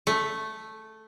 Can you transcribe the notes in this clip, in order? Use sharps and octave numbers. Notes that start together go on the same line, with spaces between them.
A3